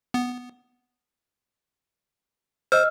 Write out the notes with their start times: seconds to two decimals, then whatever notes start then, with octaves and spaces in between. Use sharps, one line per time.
0.14 B3
2.72 C5 D#5 E6 F6